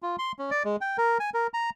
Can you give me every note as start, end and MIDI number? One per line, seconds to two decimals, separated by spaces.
0.02 0.16 65
0.19 0.32 84
0.39 0.51 61
0.51 0.63 74
0.65 0.76 56
0.81 0.97 79
0.98 1.18 70
1.20 1.30 80
1.34 1.47 70
1.54 1.70 82